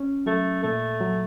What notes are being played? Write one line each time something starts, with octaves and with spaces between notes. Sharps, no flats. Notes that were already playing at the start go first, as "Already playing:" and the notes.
Already playing: C#4
F#3 A3
A#2 A3
F#3